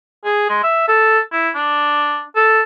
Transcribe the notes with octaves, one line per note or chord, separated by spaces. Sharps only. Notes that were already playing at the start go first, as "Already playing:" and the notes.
G#4
G#3
E5
A4
E4
D4
A4